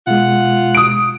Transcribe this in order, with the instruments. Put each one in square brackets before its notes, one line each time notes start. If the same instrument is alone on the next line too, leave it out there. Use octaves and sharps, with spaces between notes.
[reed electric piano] B2 G#3 [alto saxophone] F4 [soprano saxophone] F#5
[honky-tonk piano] D#6 D7